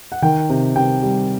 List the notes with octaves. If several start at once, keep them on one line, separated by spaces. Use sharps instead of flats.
F#5
D#3 G5
C3
C3 G5
G3